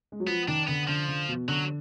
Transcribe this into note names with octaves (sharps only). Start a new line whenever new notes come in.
G#3
F#3
F3 B3
D#3 D4
D3 B3
D3 F3
D3
B2
D3 F#3